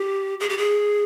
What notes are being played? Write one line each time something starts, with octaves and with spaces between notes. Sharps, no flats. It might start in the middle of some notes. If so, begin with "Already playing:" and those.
Already playing: G4
G#4
G4
G#4